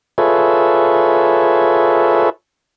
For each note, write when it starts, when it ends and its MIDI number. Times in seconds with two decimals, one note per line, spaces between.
0.18 2.30 65
0.18 2.30 68
0.18 2.30 69
0.18 2.30 71
0.18 2.30 73
0.18 2.30 76